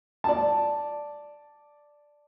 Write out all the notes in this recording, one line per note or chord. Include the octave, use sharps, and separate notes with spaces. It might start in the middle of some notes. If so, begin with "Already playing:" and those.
D5 A5